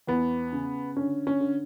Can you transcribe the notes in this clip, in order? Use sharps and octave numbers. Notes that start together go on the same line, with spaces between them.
E2 B3
C#3
D3 C#4
C#4
D3